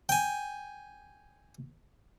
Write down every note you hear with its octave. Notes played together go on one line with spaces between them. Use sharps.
G5 G#5